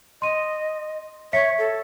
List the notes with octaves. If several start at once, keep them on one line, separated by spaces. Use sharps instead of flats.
D#5 C6 D#7
C#5 E5 B6 C#7
A4